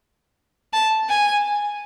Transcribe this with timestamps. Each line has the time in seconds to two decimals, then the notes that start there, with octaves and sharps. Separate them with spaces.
0.73 A5
1.09 G#5